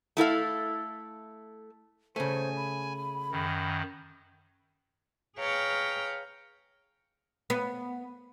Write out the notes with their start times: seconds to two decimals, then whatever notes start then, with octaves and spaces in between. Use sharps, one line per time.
0.17 A3 E4 A4 F5
2.16 C#3 A3 C5 G#5
2.56 B5
3.32 F#2 D#3
5.37 G#4 B4 C#5 F5 G5 A#5
7.50 B3